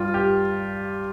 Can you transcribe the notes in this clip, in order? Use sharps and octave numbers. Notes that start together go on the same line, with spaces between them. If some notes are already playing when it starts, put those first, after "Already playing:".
Already playing: G2 G3 F4
G4